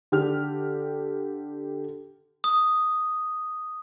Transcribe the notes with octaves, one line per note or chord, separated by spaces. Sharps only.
D3 G4 F6
D#6